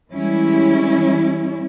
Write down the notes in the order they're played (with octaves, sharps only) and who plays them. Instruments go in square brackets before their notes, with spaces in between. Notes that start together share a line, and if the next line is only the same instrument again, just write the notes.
[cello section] E3 G3 G#3 C#4 E4